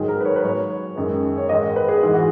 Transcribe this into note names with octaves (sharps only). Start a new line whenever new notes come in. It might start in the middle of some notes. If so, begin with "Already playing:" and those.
Already playing: G#2 D#3 F#3 G#4
A#4
B4
C#5
B4
G#2 F#3 C#5
F#2 D#3 G#3
C#5
G#2 D#3 G#3 D#5
B4
G#4
G#2 E3 G#3 G#4
F#4